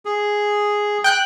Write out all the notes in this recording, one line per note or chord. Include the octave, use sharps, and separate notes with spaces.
G#4
G5 F#6